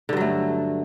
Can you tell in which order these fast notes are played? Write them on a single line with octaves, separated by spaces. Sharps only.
D3 G2 F#3 A3